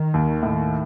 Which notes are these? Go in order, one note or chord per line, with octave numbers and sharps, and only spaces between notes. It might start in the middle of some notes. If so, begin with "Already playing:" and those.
Already playing: D#3
D#2
A2